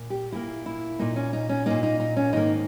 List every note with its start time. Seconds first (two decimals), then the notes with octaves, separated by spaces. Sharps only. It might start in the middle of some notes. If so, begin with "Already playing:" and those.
Already playing: A#2
0.10 G4
0.32 A#2 A#3 E4
0.66 E4
0.99 A#2 A#3 D#4
1.16 C#4
1.33 D#4
1.49 C#4
1.66 A#2 A#3 D#4
1.83 D#4
2.00 D#4
2.16 C#4
2.33 G#2 D#3 A#3 D#4